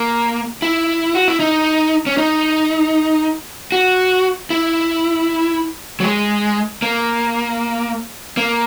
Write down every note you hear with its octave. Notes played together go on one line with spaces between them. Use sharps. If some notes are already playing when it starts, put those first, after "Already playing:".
Already playing: A#3
E4
F#4
E4
D#4
C#4
D#4
F#4
E4
F#3
G#3
A#3
A#3